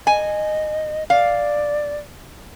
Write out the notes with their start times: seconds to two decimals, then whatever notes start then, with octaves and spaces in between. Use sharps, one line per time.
0.07 D#5 G#5
1.10 D5 F5